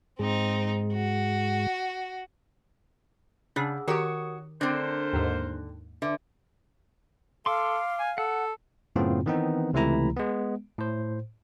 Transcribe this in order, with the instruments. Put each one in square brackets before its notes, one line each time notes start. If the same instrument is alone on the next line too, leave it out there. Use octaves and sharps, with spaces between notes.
[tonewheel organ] G#2 G#3 [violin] C4 D#4
[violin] F#4
[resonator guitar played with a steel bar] C#3 [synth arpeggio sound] D4 [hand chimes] G#4 F#5 E6
[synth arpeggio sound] D#3 G4 [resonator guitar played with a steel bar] F#4 C#5 [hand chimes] A#4 D#6
[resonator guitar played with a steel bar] D3 C4 [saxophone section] A3 A#4 C5 [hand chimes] D4 F#6 A#6
[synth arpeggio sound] D#2 G#2
[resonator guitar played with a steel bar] D3 [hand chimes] D4 B4 E5
[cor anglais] A4 [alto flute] F5 [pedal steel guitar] C6 D6
[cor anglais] G#5
[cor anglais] A4 [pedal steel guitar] F#5
[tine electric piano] F#2 A2 C#3 B3 C4 F4
D#3 E3 B3 C4 D#4
C#2 C3 E3 A3 E4 A#5
G#3 B3
A2 C5